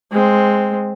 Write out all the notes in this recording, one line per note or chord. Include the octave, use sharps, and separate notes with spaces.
G#3 C4